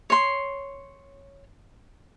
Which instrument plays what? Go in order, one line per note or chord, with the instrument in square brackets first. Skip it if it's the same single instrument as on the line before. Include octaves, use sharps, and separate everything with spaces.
[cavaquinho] C#5 C6